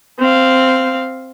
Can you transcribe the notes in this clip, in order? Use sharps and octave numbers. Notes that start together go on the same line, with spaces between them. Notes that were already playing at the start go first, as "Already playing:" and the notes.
C4 F5